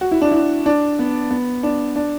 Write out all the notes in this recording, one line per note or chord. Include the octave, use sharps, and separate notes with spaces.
F#4
E4
D4
E4
D4
B3
B3
D4
D4